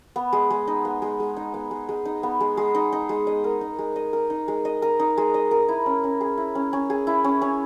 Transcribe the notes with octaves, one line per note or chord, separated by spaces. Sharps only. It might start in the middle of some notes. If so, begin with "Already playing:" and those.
B3
G#3
G#3
D#4
B3
G#3
G#3
D#4
B3
G#3
G#3
D#4
B3
G#3
G#3
D#4
D#4
G#3
D#5
A#4
D#4
G#3
D#5
A#4
D#4
G#3
D#5
A#4
D#4
G#3
D#5
A#4
E4
C#4
C#4
G#4
E4
C#4
C#4
G#4
E4
C#4
C#4